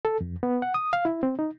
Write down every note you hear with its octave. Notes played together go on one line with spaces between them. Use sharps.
A4
F2
B3
F#5
D#6
F5
E4
C4
D#4